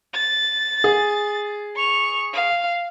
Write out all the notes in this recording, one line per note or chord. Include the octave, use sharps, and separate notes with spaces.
A6
G#4
C#6 F7
F5